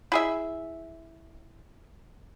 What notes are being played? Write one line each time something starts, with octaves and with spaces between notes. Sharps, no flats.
E4 G#4 E5